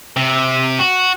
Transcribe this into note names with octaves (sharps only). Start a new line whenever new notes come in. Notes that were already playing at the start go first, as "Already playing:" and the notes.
C3
F#4